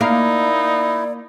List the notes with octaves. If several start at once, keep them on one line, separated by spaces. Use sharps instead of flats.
A#3 D#4 E4 D5 F5